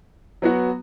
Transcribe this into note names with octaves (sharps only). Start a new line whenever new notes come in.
F#3 B3 F#4